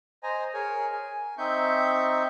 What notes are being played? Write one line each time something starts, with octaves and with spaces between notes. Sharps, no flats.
C5 D#5 G#5 A#5
G#4 A#4 C#5 G#5
G#5
C4 D#4 E5 C#6 G6